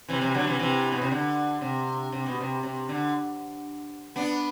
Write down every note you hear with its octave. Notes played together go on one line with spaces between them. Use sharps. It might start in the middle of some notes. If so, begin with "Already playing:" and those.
C3 E3
C3 E3
D3 F#3
C3 E3
C3 E3
B2
C3
D3
C3
C3
B2
C3
C3
D3
B3 D4